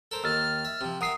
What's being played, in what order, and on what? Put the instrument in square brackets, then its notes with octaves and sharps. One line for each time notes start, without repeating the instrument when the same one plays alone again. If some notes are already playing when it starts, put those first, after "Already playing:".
[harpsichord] A4 A#4 C5
[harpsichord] D#2 D#3 [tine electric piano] E6 A6 [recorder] F6
[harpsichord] E5
C3 F3
[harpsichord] A#4 E5 G#5 [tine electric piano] F#5 D#6 C7